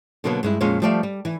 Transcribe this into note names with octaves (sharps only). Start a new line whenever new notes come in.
B2 D3 F#3 A#3 B3
G2 G#3 E4
F2 A#2 G#3 C#4 F4
F3 G3 A3 D5 E5 F5
G3
E3